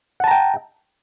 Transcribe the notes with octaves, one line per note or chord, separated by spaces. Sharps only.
F#5 G5 A5 A#5